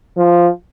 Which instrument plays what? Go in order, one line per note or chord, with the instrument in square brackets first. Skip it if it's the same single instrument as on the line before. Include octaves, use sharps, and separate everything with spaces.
[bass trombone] F3